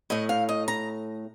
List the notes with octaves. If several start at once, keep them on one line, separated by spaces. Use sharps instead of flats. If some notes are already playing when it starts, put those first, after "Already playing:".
A2 A3 D#5
F5
D#5
A#5